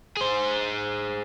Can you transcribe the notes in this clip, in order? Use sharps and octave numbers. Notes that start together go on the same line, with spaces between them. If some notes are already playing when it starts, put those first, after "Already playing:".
G#4 C5